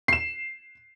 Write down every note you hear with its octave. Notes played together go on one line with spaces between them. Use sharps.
C7 E7